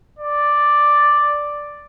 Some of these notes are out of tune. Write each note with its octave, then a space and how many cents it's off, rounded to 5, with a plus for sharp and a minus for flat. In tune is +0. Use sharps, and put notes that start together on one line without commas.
D5 +0